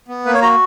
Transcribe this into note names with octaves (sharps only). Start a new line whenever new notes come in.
B3
A#3 B4
C#5
F#4 A#5